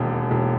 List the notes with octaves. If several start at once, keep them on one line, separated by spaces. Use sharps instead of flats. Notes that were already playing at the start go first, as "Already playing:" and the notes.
Already playing: E1 D#2
E1